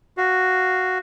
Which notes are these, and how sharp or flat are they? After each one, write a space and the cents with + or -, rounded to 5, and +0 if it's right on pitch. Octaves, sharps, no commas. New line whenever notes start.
F#4 +0 F5 +0